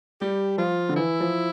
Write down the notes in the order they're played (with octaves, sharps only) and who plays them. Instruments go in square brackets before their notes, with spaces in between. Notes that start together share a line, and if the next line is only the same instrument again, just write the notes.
[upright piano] G3 [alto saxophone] G4
[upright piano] F3 [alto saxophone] F4
[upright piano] D3
[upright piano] E3 [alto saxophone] E4
[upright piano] F3